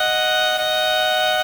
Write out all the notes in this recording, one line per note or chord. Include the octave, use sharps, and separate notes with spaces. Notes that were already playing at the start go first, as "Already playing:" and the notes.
Already playing: D#5 F#5
D#5 F#5